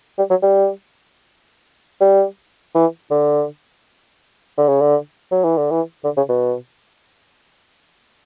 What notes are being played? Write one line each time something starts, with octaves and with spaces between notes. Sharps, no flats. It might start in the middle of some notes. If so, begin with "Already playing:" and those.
G3
F#3
G3
G3
E3
D3
D3
C#3
D3
F#3
E3
D3
E3
D3
C#3
B2